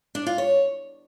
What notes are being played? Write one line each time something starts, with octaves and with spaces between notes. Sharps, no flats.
D4
F4
C#5